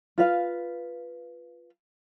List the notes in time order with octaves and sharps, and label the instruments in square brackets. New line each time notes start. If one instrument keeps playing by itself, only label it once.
[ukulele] F4 B4 F5